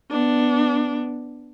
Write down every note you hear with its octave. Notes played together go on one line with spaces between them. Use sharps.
B3 D4